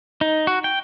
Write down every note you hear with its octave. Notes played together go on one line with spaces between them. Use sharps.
D#4
F#4
G5